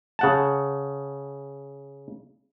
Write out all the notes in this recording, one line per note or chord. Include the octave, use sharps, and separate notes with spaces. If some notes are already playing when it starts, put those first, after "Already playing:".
C#3 F#5 A5